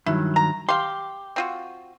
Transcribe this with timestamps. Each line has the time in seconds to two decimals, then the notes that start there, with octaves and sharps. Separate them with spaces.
0.06 G2 D#3 F#3 E4
0.36 A#5
0.69 G4 F5 C6
1.36 C4 F4 F#4